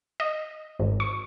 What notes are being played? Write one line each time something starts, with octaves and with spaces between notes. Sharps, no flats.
D#5
G#1
C#6